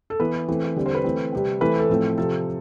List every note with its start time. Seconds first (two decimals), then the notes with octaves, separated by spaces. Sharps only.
0.10 A4
0.20 E3 B3 B4
0.48 E3 A3 C4
0.76 D3 G3 C4
0.86 C5
0.95 B4
1.04 E3 A3 C4
1.33 C3 G3 C4
1.61 E3 A3 C4 B4
1.79 A4
1.90 A2 F3 A3 C4
2.18 C3 F3 C4 A4